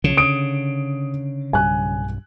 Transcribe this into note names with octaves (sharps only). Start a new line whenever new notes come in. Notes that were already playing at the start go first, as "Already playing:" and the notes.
B1 C#3 F3
D3 D#6 D7
B1 G2 G3 G#5 F#6